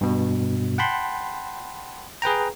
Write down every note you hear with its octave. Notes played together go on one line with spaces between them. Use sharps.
G2 B2
F#5 G5 A5 B5 C6
G#4 B4 G5 A#5